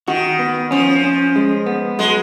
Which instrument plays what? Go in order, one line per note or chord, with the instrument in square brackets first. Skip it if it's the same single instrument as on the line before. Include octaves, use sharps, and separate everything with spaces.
[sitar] D#3 [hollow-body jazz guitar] F#4
[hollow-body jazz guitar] B3
[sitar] F3 [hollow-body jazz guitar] C#4
[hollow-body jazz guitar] C#4
G#3
B3
[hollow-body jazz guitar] F#3 [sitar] G#3